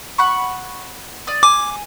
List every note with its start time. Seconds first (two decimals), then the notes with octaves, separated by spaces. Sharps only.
0.18 F#5 B5 C#6
1.27 D5 D#6
1.43 G#5 D6